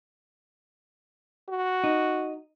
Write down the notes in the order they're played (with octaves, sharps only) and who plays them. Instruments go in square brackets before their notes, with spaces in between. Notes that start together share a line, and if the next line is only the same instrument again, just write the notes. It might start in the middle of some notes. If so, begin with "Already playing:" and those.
[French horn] F#4
[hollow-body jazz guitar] D#4